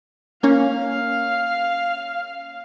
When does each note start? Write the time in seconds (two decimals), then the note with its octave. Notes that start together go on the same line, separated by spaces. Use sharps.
0.43 A#3 C#4 F5